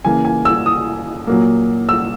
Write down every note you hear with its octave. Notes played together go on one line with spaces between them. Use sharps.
C#3 E3 A#3 G#5
G#5
E6
D#6
A#2 F#3 A#3
E6